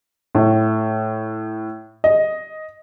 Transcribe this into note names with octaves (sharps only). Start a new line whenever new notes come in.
A2
D#5